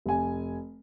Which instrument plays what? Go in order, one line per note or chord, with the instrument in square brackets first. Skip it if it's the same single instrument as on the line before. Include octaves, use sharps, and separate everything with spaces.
[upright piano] F1 G#5